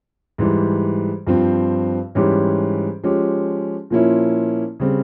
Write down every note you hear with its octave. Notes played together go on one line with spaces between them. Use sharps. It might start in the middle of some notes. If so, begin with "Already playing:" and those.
G#2 E3 G3
G2 F3 C4
G#2 E3 G3 C#4 G4
F3 G#3 C#4 G4
A#2 F3 A#3 C#4 E4
C#3 G3 C4